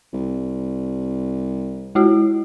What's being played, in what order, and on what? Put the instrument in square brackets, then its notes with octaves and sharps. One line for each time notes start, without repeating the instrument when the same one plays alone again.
[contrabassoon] C2
[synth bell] G#3 E4 F#4